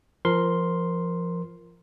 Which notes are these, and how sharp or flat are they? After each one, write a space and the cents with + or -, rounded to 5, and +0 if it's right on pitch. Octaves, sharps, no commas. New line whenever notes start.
F3 -15 A#4 +0 C6 +0